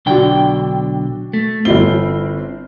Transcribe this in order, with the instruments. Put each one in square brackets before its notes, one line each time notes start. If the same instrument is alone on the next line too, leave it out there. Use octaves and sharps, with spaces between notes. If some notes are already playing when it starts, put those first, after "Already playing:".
[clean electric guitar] B1 D3 G5 [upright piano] D4 F#4
[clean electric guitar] A3
[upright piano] G1 E4 G7 [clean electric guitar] C4